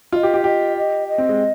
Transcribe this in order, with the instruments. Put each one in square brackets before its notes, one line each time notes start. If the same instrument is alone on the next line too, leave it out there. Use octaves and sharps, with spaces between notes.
[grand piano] F4 [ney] D#5
[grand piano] G4
G4
[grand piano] G4 [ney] D#5
[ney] D#5
D#5
[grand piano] C4
G#3